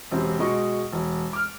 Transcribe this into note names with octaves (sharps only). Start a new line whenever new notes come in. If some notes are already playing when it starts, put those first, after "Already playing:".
E1 C3 C4
B2 G#3 D#5 C#6 D6
E1
D6 F6